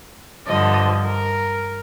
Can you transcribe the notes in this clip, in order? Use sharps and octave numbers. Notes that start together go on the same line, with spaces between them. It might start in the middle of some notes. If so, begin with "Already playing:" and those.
G2 D3 F3 D#5
A#4